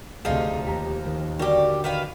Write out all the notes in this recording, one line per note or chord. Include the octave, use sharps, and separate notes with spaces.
D2 C3 F3 D#4 G#4 D#5 F5
D#2 G4 A#5
D#3
D3 G3 F#4 G4 A#4
D#3 B4 F5